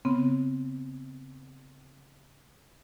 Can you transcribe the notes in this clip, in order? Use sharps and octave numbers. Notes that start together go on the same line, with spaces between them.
C#3 B3 C4